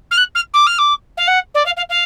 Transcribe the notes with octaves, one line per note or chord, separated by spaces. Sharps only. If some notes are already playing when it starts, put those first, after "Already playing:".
F6
F#6
F6
D6
F6
D6
F5
F#5
D5
F5
F5
F5